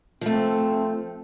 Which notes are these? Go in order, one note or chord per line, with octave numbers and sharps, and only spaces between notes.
F3 A3 C4